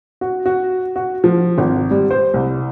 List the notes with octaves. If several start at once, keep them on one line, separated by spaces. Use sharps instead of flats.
F#4
F#4
F#4
F3
G#1
G3
C5
C2